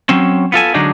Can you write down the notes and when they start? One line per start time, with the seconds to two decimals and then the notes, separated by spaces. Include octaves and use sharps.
0.09 F#3 C4 C#4
0.52 B3 F4 A4 G#5
0.74 D3 F#3 G#3 D4 D#4